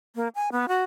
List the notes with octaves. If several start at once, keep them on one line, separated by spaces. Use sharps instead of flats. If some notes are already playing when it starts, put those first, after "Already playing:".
A#3
G#5
B3
F#4